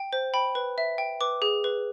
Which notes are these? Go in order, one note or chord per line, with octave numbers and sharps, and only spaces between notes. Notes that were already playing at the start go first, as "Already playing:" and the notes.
Already playing: G5
C5
G5 B5
B4
E5
G5
B4 D6
G#4
B4